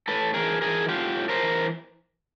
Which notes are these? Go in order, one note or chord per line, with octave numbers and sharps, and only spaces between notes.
A2 A4 B4
E3 G#4 A#4
E3 G#4 A#4
A2 F4 G4
A2
A#4 C5
E3